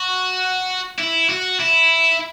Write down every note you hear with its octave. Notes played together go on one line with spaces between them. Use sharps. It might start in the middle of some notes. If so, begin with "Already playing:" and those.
Already playing: F#4
E4
F#4
E4